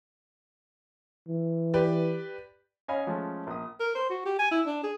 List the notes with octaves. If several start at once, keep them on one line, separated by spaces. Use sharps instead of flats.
E3
G4 B4 D5
C#4 C#5 D#5 F5 G#5 B5
F3 G#3 A3 C#4
A#1 D#6
A#4
C5
F#4
G4
G#5
E4
D4
G#4